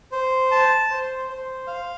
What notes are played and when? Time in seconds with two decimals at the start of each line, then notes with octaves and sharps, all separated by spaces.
0.12 C5
0.51 A5
0.90 C5
1.29 C5
1.67 F5